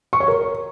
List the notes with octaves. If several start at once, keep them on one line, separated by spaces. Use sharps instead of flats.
C#6
C#5
A#4